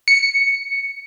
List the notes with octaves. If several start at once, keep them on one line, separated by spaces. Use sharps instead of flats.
C#7